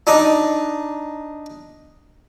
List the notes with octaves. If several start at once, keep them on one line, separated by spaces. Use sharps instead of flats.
D4 D#4